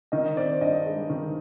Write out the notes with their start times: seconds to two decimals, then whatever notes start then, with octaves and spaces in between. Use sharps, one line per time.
0.12 D#3 D#5
0.36 C4 D5
0.61 G2 D#5
0.86 G#3
1.10 D#3